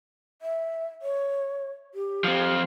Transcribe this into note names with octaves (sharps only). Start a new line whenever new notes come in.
E5
C#5
G4
F3 C4